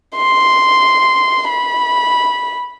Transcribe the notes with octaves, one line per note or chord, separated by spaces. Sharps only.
C6
B5